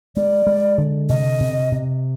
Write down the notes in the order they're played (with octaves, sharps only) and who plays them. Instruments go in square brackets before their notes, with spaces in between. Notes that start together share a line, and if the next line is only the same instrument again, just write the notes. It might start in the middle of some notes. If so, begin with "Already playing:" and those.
[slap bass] G#3 [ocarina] D5
[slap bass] G#3
D3
[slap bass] C3 [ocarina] D#5
[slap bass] C3
C3